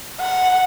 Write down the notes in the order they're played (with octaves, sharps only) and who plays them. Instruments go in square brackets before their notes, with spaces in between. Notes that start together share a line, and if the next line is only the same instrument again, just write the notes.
[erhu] F#5